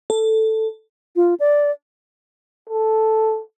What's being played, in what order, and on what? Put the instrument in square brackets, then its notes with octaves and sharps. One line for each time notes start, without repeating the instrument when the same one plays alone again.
[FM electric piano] A4
[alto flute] F4
D5
[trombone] A4